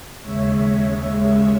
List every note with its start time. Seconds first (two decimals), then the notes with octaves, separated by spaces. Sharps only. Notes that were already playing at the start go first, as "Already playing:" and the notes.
0.22 D#2 C#3 G#3 C#5 E5
0.62 C#5 E5